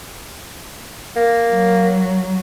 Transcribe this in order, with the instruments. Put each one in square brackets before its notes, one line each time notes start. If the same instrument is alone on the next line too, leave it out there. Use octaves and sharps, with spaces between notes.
[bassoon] A#3
[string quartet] F#3